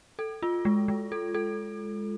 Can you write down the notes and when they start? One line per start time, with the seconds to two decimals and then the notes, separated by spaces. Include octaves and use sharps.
0.19 A4
0.42 F4
0.65 G#3
0.88 G#3
1.12 A4
1.34 A4